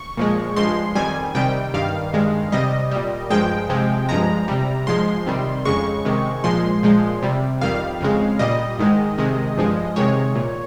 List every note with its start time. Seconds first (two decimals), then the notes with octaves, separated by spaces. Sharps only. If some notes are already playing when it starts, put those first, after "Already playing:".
Already playing: C#6
0.17 A#2 F3 G#3
0.56 G2 F3 G#3 C6
0.95 F2 D#3 G3 G#5
1.35 C3 D#3 G3 G5
1.74 G2 D#3 G3 F5
2.13 G2 D#3 G#3
2.52 C3 G3 D#5
2.91 A#2 G3
3.30 G2 F3 G#3 G5
3.70 C3 F3 G#3
4.09 G2 F3 G#3 A#5
4.48 C3 G3
4.87 G#2 F3 G#3 C6
5.26 C3 D#3 G3
5.65 F2 C#3 G#3 C#6
6.05 C3 D#3 G#3
6.44 A#2 F3 G#3 C6
6.83 A#2 F3 G#3
7.22 C3 G3
7.61 F2 D#3 G3 F5
8.01 F2 C#3 G#3
8.39 A#2 G3 D#5
8.79 G#2 D#3 G#3
9.18 C3 D#3 G#3
9.58 G2 F3 G#3
9.96 C3 D#3 G#3 C#5
10.35 A#2